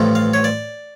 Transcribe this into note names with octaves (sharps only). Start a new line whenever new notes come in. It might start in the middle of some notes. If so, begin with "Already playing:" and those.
Already playing: A1 G2 F3 A3
F5
C#5
D5